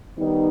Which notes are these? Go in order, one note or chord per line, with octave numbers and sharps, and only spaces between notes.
D#3 G3 B3 D#4